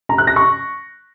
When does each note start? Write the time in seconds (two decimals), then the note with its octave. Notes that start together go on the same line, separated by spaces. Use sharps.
0.09 A#5
0.18 F#6
0.27 A#6
0.36 C#6